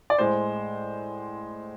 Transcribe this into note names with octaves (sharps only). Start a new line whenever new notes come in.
D5
A2 G#3 C5